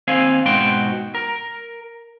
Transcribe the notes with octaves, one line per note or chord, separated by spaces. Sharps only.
D#2 C4 F5 G#5
G#2 B2 F#4 G5 C6
A#4